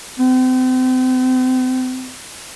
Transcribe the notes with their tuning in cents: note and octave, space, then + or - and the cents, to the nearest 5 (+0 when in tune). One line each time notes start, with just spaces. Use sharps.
C4 -35